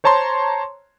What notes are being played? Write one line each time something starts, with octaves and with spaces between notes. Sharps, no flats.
C5 C#5 A5 A#5 C6